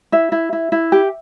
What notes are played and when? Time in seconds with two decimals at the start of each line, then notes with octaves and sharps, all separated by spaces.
0.12 E4 E5
0.32 E4
0.53 E4
0.72 E4
0.92 G4